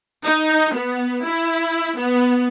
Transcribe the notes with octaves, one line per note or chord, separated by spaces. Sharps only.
D#4
B3
E4
B3